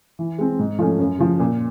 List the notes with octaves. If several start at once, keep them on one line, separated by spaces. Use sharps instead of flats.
E3
G#3 C4
G#2
F3 A3 C#4
F#2
C#3 F3
A#2